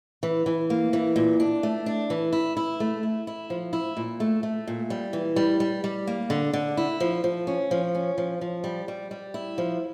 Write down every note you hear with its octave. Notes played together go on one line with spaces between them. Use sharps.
E3
E3
A#3
E3
A#2
D4
A3
D4
E3
E4
E4
A3
E4
E4
F3
E4
A#2
A3
A3
A#2
G3
E3
G3
G3
G3
A#3
D3
D3
E4
F3
F3
C#4
F3
C#4
F3
F3
G3
G3
G3
E4
F3